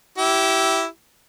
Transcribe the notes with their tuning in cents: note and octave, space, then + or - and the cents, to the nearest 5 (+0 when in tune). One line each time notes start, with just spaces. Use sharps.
E4 +0 G4 -25